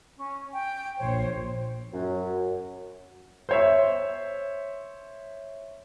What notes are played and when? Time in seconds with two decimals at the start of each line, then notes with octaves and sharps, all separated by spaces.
0.17 C#4
0.52 G5
0.98 A#1 C5 C#5
1.93 F#2
3.49 C5 C#5 E5